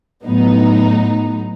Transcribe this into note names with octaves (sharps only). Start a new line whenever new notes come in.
A2 F#3 B3 D#4